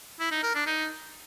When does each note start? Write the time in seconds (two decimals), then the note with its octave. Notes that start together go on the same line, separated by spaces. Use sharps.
0.20 E4
0.31 D#4
0.43 A#4
0.55 D4
0.66 D#4